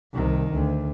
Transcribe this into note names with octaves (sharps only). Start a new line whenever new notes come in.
C2 D#3
D2